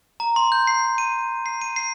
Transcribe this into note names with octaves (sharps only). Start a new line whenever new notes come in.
A#5
C6
G6
C7
D#7
C7
D#7
C7